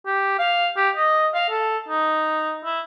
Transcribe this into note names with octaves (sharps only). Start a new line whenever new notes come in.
G4
F5
G4
D#5
F5
A4
D#4
E4